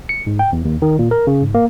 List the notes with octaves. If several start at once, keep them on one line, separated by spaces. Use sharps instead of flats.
C#7
G#2
G5
E2
D#2
D#3
A#2
A#4
C#3
G#2
A#3